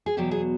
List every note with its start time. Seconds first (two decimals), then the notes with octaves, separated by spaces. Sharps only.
0.06 G#4
0.17 E2 B2 F#3 G4
0.31 G#4